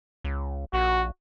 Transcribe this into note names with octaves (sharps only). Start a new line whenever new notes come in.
C#2
A#1 F#4